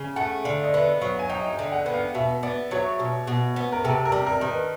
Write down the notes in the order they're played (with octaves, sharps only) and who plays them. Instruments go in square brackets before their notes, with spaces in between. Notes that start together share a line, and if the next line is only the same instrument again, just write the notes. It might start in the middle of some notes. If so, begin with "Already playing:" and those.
Already playing: [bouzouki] C#3 [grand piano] G#5
[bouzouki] A3 [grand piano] F#5
[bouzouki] D3 [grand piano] F5
[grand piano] D#5
[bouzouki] B3 [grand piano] E5
[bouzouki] F#3 [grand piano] F5
[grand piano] G#5
[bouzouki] D#4 [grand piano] G5
[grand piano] G5
[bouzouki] D3
[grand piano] F#5
[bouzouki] B3
[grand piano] F5
[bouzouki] B2 [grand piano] E5
[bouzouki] B3 [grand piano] D5
[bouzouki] F#3 [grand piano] C#5
[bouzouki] B2
B2
B3
[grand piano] A#4
[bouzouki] C3 [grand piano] A4
[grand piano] A#4
[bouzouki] G3
[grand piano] A#4
[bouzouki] D#3
[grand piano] B4